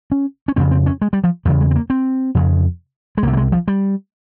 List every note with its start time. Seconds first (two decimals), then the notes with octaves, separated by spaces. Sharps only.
0.12 C#4
0.48 C#4
0.56 F2 C#3 C4
0.71 C4
0.86 C#4
1.02 G#3
1.13 G3
1.24 F3
1.45 E2 G3
1.49 C#3
1.61 G#3
1.71 C4
1.75 A#3
1.90 C4
2.35 F2 C#3
3.17 G#3
3.23 C2 A#3
3.27 C3
3.33 A#3
3.37 G#3
3.52 F3
3.68 G3